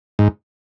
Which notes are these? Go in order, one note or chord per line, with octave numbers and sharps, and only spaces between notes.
G#2